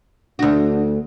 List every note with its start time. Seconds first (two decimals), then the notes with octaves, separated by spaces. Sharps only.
0.39 D2 D4 F#4